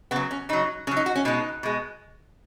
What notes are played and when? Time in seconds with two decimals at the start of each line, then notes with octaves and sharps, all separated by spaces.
0.11 C#3 F#3 B3
0.31 C#4
0.49 C#3 F#3 D#4
0.87 C#3 F#3 C#4
0.97 D#4
1.06 F#4
1.16 C#4
1.25 B2 G#3 D#4
1.63 B2 G#3